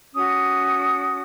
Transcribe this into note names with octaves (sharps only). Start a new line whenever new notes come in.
C#4 F#4 D#6